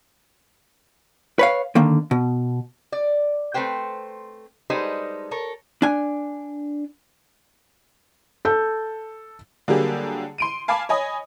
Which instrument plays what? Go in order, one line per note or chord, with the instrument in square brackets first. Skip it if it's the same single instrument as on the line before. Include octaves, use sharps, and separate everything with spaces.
[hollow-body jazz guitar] B4 C#5 F5
D3 D#3 A#3
B2
[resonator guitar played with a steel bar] D5
A3 C4 B4 C5 G5
G3 G#3 D#4 A4 B4 C5
A4 A#4 C#5
[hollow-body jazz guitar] D4 G#5
[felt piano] A4 G6
[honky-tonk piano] D3 F#3 G3 A#3 G4 G#4
C6 D7 D#7
F5 G#5 A5 B5 D6
C#5 D#5 G#5 B5 D#6